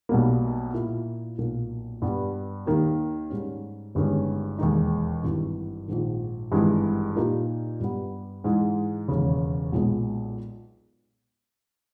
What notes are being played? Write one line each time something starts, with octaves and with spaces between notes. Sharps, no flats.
B1 B2 G3 A#3
A#2 A#3 E4
B1 A#2 A#3
G2 G3 B3
D#2 D#3 A#3 D#4 G4
G#2 G3 C#4
G1 G2 D#3 G#3 C#4
E1 D#2 D#3 G#3 D#4
G#1 G2 E3
A#1 G#2 D#3
G#1 G2 E3 G#3
A#2 A#3 D#4 G4 A#4
G2 G3 B3
G#2 E3 G#3
E1 D#2 C#3
B1 A#2 G#3 B3